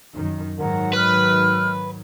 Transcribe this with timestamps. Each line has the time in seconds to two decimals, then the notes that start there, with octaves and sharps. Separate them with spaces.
0.14 F#2 D#3
0.57 G#2 D#3 F#3 A#4 F#5
0.94 B4 F6